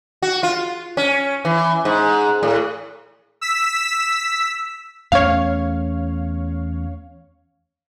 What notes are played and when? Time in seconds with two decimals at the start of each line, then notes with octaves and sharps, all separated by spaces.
0.22 F#4
0.43 F4
0.97 C#4
1.45 E3
1.85 G#2
2.43 A2
3.41 E6 B6
5.12 E2 A3 C#4 C#5 F5